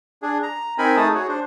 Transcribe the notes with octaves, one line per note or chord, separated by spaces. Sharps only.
D4 G#4
A#5
C4 D#4 A#4 G#5 B5
A3 D#4 G#4 A5 D#6
F#4 G#4 C#5
D4 C5